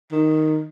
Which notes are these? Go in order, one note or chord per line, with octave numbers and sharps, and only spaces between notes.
D#3